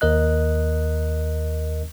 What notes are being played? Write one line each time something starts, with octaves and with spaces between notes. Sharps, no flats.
D#2 A#4 D#5 F#6